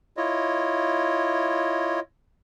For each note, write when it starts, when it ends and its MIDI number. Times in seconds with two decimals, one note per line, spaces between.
0.17 2.00 64
0.17 2.00 65
0.17 2.00 73
0.17 2.00 75